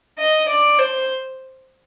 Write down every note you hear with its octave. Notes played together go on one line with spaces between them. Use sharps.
D#5
D5
C5